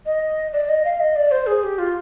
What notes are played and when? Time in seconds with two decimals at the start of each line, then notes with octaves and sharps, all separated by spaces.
0.06 D#5
0.53 D5
0.69 D#5
0.85 F5
1.00 D#5
1.16 D5
1.31 C5
1.47 G#4
1.63 G4
1.78 F4